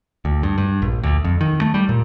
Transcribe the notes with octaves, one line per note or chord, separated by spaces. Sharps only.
D2
G2
G2
A#1
D2
F2
D#3
A3
G3
A#2